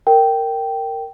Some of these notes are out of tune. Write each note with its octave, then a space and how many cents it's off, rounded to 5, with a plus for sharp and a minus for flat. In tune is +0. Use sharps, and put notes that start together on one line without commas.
A#4 -15 G5 -10